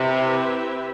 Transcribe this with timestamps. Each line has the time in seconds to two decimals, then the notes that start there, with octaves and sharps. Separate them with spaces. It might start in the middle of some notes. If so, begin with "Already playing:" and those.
Already playing: C3 C4 E4 G4 B4 E5